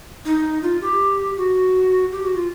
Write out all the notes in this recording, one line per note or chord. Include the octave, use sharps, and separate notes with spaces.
D#4
F4
G4
F#4
G4
F#4
F4